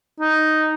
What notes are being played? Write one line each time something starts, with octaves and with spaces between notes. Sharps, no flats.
D#4